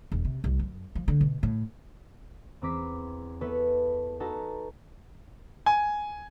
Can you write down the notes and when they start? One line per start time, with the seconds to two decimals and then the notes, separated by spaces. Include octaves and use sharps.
0.12 E1
0.25 C3
0.44 C2
0.59 F#2
0.95 F3
1.08 D3
1.21 B2
1.43 A2
2.62 E2 C4 A#5 D6 B6
3.41 B3 E4 A4 B4 C#5
4.20 D#4 F#4 A4 B4 A5 A#5
5.66 G#5